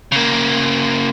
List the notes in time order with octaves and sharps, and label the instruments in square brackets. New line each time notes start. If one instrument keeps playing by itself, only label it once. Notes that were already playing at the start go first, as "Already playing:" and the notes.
[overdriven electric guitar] C#3 A#3